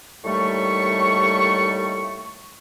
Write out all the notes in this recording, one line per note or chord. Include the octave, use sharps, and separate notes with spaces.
D#2 A2 G3 A3 C#6